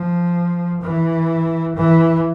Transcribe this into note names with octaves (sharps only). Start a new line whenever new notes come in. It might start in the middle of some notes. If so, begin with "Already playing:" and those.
Already playing: F3
E3
E3